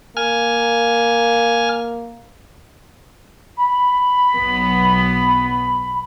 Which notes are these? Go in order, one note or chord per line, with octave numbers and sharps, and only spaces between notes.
A#3 G#5 F6
B5
B1 B3